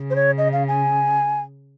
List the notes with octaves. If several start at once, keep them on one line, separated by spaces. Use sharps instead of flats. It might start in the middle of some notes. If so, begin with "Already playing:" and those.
Already playing: C#3
C5
C#5
D#5
F5
G#5